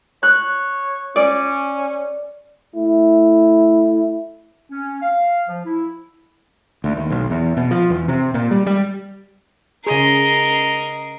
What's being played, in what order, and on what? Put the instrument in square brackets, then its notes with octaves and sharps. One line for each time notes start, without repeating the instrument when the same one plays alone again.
[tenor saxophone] C#5 [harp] F#6
[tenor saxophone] C#4 [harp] D5
[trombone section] A3 E4
[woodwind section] C#4
F5
F3
E4
[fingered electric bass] D2
D#2
B1
E2
B2
F3
E2
C3
A#2
G3
G3
[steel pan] C#3 G#4 [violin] A#4 C7 [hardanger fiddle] D#5